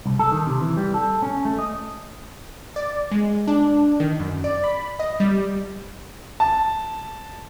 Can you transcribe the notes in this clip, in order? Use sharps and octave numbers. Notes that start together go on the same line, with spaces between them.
C2
A4
D#3
C3
E3
G3
A4
C#4
A3
D#5
D5
G#3
D4
D#3
F#2
D5
B5
D#5
G3
A5